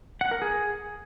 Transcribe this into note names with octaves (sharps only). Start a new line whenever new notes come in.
F#5
A#4
G#4